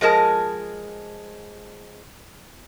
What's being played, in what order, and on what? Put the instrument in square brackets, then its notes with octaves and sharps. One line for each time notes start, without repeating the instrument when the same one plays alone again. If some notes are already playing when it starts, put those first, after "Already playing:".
[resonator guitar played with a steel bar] F3 G#3 A#4 A5